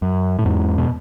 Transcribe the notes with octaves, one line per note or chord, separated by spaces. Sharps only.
F#2
A2
E2 G#2
B2